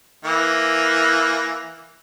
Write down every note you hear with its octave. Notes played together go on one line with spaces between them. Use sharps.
E3 A#3